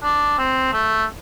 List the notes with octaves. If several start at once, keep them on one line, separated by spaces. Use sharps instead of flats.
D4
C4
A3